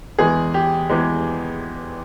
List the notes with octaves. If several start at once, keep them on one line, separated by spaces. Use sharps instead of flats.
E2 E3 G#3 G#4
G4
E2 E3 G#3